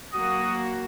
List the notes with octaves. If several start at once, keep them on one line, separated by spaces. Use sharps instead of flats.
F#3 A#3 F#4 D#6